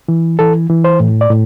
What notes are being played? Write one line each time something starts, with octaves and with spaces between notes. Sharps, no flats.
E3
E3 A4
E3
C5
A2
D5
A2